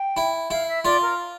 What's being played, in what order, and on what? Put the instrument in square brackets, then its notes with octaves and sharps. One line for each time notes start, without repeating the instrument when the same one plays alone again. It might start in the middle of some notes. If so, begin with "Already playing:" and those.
Already playing: [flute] G5
[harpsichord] E4
[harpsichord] E4 [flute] F5
[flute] E5
[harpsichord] F4 [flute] D5
[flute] A#4